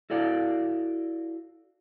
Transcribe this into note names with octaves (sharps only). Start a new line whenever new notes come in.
E4 F#4 A4 D5 F5